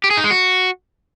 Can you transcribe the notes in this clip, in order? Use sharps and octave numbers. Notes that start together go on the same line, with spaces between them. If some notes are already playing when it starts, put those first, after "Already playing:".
G4
G#4
D#4
G#3
F#4